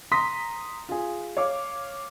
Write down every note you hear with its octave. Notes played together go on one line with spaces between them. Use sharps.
A#5 C6 D#6 A#6 B6
F4 G#4
C#5 F5 D6